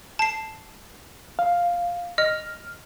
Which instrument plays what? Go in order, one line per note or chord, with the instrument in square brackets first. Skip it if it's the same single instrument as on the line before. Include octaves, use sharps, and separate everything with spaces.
[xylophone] A5 C7
[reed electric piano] F5
[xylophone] D#5 [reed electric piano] F6